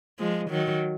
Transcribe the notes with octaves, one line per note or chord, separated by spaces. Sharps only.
F3 G#3
D#3 F#3